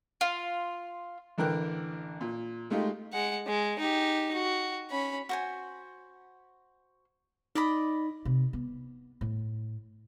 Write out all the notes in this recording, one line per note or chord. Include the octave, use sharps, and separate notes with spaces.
F4
A1 D3 E3 A#4 G5 F#6
A#2
G#3 A3 D#4 F4 G4
G#3 F#5
G#3
D#4 G4
F#4
C#4 B5
F#4 C5 G#5
D#4 D5 D#5 B5
C3
B3
A2